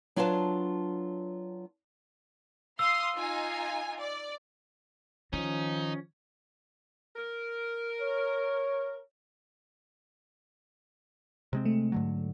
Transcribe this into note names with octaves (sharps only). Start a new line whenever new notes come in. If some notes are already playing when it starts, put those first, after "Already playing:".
F#3 D4 F4 B4 F5 A5
F5 C6 D#6 E6
D#4 F4 G#5
D5
D#3 F3 C#4 D#4
A#4
C#5
C3 G#3 C4
A3
G#2 D3 F#3